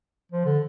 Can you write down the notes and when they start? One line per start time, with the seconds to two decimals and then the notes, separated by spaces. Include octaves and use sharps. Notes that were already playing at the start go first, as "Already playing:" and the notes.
0.32 F3
0.45 D3